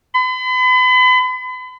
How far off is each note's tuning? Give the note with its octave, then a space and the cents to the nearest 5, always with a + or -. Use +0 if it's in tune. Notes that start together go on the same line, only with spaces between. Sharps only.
B5 +40